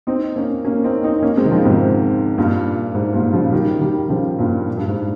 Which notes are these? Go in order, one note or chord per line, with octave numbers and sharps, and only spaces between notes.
C4 D#4
A#3 C#4
A#3 C#4
C4 D#4
C4 D#4
A#3 C#4
G#3 C4
D#3
C#3 F3
G#2 C3
G2 A#2
G#2
G2 A#2
C#3 F3
D#3 G3
D#3 G3
C#3 F3
G2 A#2
G2
G#2